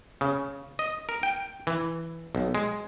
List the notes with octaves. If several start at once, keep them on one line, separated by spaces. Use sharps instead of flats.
C#3
D#5
A#4
G5
E3
B1
G#3